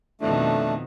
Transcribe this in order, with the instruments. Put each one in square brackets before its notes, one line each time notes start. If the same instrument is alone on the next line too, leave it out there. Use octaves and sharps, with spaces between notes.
[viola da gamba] F2 B2 D#3 [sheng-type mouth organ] A3 D4